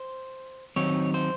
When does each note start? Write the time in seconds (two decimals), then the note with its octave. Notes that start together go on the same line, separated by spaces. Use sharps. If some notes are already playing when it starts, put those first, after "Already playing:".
Already playing: C5
0.76 D#3 F#3 C4 D#4 C#5
1.14 C5